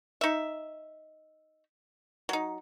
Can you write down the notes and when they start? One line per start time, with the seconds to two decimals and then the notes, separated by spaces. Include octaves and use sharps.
0.21 D#4 E5
2.29 F#3 D#4